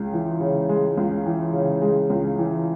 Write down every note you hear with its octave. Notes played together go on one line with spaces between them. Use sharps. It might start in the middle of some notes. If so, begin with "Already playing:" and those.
Already playing: C#2 G#3
E3
C#3
G#3
C#2
E3
C#3
G#3
C#2
E3